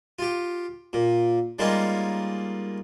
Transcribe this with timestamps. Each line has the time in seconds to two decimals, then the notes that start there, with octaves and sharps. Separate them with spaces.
0.19 F4 G4
0.93 A#2
1.59 G3 G#3 A#3 C#4 D#4 F4